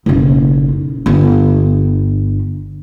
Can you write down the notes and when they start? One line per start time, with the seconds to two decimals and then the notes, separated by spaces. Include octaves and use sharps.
0.06 F#1 B1
1.06 G1